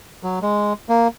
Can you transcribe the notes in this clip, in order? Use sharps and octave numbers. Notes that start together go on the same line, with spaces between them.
F#3
G#3
A#3